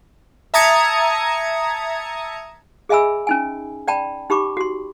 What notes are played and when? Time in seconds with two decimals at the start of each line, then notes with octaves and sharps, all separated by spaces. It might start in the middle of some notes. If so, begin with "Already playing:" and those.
0.54 E5 A5 A#5 D#6 G#6 C#7
2.89 G#4 D#5 E5 G#5 B5 E6
3.27 C#4 D#4 G#5
3.88 D5 G5 A5 B5
4.30 D#4 G4 B5 C#6 D6
4.57 F#4 C6